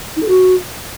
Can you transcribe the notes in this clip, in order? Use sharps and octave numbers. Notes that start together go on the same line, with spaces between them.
D#4
A4
F#4